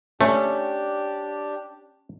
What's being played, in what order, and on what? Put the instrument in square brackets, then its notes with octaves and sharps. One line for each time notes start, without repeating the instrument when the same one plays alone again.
[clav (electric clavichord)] A3 [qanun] C#4 [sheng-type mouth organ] D4 G4